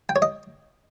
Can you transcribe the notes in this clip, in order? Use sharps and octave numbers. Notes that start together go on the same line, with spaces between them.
G5
C#5
D#5